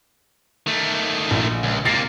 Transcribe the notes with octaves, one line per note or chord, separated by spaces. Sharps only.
D#3 A3
A#1
C#2
C3 A#3 A6 A#6 C7